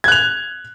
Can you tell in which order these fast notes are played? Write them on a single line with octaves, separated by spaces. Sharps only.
G#6 F#6 F7